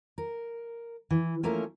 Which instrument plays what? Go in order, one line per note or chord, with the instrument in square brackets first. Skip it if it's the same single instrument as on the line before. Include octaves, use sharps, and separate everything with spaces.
[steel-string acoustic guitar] A#4
E3
F3 A3 A#3 C#4 A#4